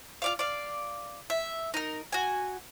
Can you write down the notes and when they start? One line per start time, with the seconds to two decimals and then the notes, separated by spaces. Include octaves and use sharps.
0.22 F4 D5 F5
0.39 D5 F5
1.30 E5
1.74 D#4 A#4
2.12 F#4 G#5